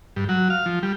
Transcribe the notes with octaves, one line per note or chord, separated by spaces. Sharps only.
G2
F#3
F5
F3
G3